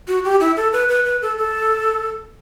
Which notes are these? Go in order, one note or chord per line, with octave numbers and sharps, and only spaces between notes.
F#4
G4
E4
A4
B4
B4
B4
A4
A4